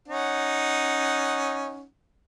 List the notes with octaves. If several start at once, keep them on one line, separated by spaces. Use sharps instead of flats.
C#4 D#4 F#5